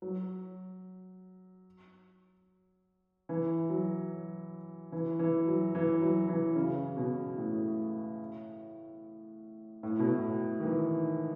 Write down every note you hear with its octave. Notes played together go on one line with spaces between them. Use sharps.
F#3
E3
F#3
E3
E3
F#3
E3
F#3
E3
C#3
B2
A2
A2
B2
A2
D#3
E3